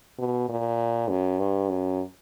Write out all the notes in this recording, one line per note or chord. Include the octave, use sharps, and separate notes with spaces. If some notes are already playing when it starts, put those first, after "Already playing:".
B2
A#2
F#2
G2
F#2